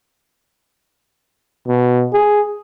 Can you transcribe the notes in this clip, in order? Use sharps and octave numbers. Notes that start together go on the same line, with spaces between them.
B2
G#4